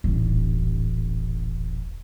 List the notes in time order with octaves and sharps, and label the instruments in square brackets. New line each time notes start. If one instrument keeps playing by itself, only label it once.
[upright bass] D#1 A1